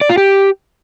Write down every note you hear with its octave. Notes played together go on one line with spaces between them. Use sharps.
D5
F4
G4